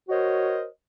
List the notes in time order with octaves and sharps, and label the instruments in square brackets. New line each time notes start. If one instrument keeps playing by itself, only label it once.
[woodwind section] F#4 A#4 C5 C#5 D#5